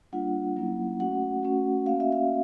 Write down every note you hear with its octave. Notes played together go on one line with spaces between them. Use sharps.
G3 A#3 D4 F4 F#5
F#3 A#3 C#4 E4
A3 C#4 F#4 F#5
A3 C#4 F#4
A#3 C#4 F#4 F5
E5
F5